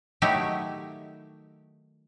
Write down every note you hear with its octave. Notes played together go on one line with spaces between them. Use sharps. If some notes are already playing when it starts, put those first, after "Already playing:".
D#3 F#3 A3 D#4 E4 G4